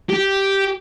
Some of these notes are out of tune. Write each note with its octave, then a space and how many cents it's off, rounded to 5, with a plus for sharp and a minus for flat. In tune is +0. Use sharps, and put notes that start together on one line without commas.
G4 -5